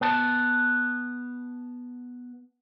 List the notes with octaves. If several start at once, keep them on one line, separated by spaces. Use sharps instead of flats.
B3 A5